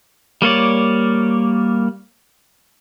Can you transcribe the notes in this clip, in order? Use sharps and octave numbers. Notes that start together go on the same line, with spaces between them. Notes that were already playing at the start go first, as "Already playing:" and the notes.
G3 A#3 C#5 D5